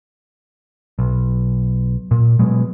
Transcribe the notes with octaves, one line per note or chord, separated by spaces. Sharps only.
B1
A#2
B2 F#3 G#3